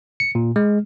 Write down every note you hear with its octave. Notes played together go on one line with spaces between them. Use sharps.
C#7
A#2
G#3